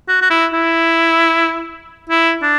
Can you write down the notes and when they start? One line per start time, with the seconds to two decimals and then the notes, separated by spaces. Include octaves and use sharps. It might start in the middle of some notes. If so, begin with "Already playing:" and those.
0.08 F#4
0.22 F#4
0.30 E4
0.53 E4
2.09 E4
2.42 D4